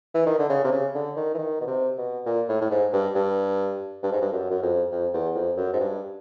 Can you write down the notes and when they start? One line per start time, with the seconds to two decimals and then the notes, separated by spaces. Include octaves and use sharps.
0.14 E3
0.26 D#3
0.39 D3
0.50 C#3
0.64 C3
0.72 C#3
0.95 D3
1.16 D#3
1.34 E3
1.38 D#3
1.61 B2
1.67 C3
1.98 B2
2.26 A#2
2.49 A2
2.61 A2
2.70 G#2
2.93 G2
3.15 G2
4.03 G2
4.12 G#2
4.22 G2
4.32 F#2
4.50 F#2
4.62 F2
4.92 F2
5.13 E2
5.35 F2
5.57 F#2
5.73 G#2
5.80 G2